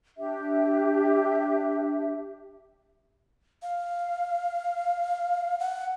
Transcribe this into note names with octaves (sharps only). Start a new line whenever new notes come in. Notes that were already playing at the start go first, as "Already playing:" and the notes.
D4 G4 E5
F5
F#5